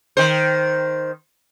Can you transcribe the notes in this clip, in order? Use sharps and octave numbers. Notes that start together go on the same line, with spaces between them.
D#3 C5